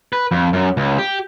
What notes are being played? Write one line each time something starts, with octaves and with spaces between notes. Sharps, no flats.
B4
F2
F#2
C#2
G4